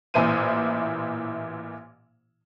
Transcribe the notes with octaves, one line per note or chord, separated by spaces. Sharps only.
A1 A#2 E3 E4 C5 D#7